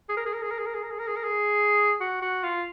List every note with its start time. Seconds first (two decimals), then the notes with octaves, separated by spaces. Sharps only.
0.09 G#4
0.17 A#4
0.26 G#4
0.33 A#4
0.42 G#4
0.51 A#4
0.58 G#4
0.66 A#4
0.75 G#4
0.83 A#4
0.91 G#4
0.99 A#4
1.07 G#4
1.16 A#4
1.23 G#4
2.01 F#4
2.22 F#4
2.43 F4